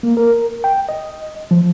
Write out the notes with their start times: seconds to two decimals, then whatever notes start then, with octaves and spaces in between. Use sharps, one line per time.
0.03 A#3
0.17 A#4
0.64 G5
0.89 D#5
1.51 F3